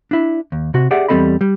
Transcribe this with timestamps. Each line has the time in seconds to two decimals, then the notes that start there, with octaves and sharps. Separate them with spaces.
0.11 D4 E4
0.52 D#2
0.74 C3 F#4
0.91 G4 G#4 D5 E5 F#5
1.08 E2 G3 C4 A4 D#5 B5
1.41 G3